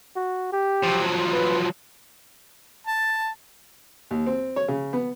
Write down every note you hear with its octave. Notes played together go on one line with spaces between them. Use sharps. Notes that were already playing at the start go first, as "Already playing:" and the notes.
F#4
G4
F3 F#3
B4
A5
D#2
C4
C#5
C#3
B3